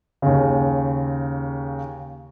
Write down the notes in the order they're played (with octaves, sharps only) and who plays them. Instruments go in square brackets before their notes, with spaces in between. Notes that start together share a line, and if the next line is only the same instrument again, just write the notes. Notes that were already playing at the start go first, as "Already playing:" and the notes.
[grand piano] D#2 C#3